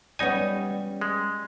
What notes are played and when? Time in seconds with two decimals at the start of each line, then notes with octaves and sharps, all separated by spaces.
0.19 G3 B3 C#4 D#4 G#5
1.01 G#3